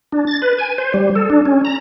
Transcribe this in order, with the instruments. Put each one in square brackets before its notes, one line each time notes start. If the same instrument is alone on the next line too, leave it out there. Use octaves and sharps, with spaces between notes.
[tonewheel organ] D4
A6
B4
G#5
C5
G3
A4
D4
C#4
A#5